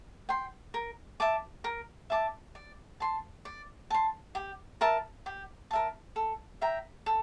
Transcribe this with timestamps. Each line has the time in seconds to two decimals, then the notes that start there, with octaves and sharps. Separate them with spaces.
0.29 G5 C6
0.74 A#4
1.20 E5 A5 D6
1.64 A#4
2.10 E5 A5 D6
2.55 D5
3.00 A5 C6
3.45 D5
3.90 A5 C6
4.35 G4
4.81 A#4 E5 A5
5.26 G4
5.71 A#4 E5 A5
6.16 A4
6.61 E5 G5 A#5
7.06 A4